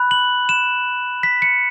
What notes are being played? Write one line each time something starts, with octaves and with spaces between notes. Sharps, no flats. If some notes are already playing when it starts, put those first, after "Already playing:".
Already playing: B5 F#6
F#7
E7
B6
C#7